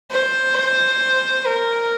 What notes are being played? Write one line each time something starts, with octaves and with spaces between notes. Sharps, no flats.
C5
A#4